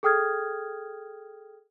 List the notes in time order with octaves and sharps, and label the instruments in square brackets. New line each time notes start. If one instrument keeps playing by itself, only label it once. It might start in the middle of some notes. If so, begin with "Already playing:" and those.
[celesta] G#4 A4 G5 D#6 F6 G#6